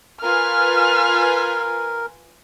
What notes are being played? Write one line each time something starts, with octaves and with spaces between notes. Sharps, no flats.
F4 A#4 B4 G#5 F6